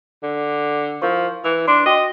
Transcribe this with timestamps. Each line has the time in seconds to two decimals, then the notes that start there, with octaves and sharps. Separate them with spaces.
0.23 D3
1.02 F3 E4 A#4 C#6
1.44 E3 E6
1.68 D4 C6
1.86 F#4 D#5 G5